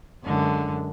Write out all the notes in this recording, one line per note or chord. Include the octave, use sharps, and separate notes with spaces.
F#2 D3 G#3